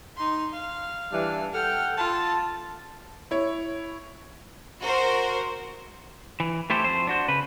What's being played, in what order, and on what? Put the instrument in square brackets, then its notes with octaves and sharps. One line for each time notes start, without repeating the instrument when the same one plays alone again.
[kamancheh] D#4 C6
F5
[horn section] E3 G3 D4
[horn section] A4 F#5 G5 [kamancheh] F6
[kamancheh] F4 A4 [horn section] A5
[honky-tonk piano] E4 C#5
[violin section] F#4 A#4 C5
[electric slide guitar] E3
A3 E4 G4 A4 C5
F2 A3 C5
D4 F#4 C5
C#3 B4